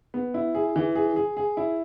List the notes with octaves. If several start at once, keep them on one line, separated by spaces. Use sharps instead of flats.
B3
E4
G#4
E3
G#4
G#4
G#4
E4